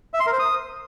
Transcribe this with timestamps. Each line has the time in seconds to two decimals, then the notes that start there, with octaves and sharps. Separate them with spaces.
0.14 E5
0.20 C6
0.26 A#4
0.33 C5
0.39 D#6